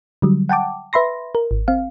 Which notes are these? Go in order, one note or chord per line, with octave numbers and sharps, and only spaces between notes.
D3 F#3 G3
F#5 G5 A5 D6
B4 E5 B5 C6 A#6
A#4
G#1
C4 F5